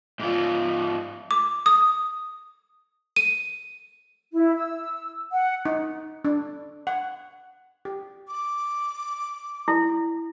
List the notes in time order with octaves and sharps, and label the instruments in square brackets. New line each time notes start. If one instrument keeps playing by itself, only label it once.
[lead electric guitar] G#2 F4
[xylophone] D6
D#6
D#7
[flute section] E4
E6
F#5
[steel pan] D#4
D4
F#5
G4
[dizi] D6
[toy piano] E4